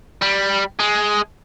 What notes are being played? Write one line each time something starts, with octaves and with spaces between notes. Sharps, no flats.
G3
G#3